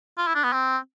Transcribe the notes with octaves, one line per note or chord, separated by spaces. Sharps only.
F4
E4
D4
B3
C4